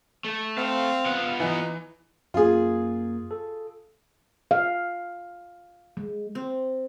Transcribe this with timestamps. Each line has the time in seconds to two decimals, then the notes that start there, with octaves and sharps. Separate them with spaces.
0.25 A3 A4
0.58 C4 F5
1.06 B3 F4 F#5
1.40 E3 D#4
2.34 F#2 A#3 F4 G#4
3.31 A4
4.51 F5
5.97 G#3
6.35 C4